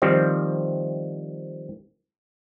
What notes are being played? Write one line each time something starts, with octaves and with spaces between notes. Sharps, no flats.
D#3 F3 G3 C4